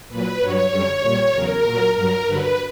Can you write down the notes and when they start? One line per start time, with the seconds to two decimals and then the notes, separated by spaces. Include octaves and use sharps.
0.09 A#2 F#3 B4
0.39 G2 F#3 C#5
0.70 F#2 D3 G3
1.02 A#2 G3
1.33 E2 C#3 F#3 A#4
1.63 A#2 F#3
1.94 G2 F#3 A#4
2.25 G2 D3 F#3 B4